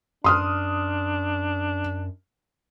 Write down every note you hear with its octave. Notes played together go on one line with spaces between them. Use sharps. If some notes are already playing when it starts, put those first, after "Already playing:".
F#2 D4 C6 D#6 F6